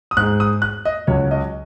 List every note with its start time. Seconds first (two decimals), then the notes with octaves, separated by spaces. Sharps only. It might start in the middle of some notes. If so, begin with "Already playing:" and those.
0.11 D#6
0.17 G#2 F#6
0.19 G#3
0.40 D#6
0.62 F#6
0.85 D#5
1.07 C#2 C#3 F#3 C#5
1.31 D#5